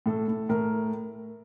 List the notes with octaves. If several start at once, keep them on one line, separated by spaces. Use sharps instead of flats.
A2 A4
A2
A2 A#4